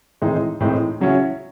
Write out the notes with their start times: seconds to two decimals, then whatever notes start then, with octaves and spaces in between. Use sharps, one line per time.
0.22 A2 E3 G#3 C4 D#4
0.60 A2 E3 G#3 C4 D#4
1.01 C#3 F#3 C#4 E4